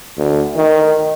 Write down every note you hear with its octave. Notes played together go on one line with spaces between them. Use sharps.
D2
D#3